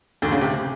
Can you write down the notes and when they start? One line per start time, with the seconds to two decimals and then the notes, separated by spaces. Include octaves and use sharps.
0.22 D2 D3
0.31 C#3
0.41 C3